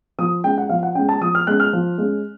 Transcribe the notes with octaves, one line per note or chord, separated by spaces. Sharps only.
F3 D#6
G#3 C#4 G5
F#5
F3 F5
F#5
G#3 C#4 G5
A5
F3 D#6
F6
G#3 C#4 F#6
F6
F3
G#3 C#4